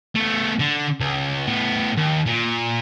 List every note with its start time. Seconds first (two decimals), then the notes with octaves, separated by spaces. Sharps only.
0.15 A3 B3
0.59 D3
1.01 C#2
1.47 A2 B3
1.97 D#2
2.26 A#2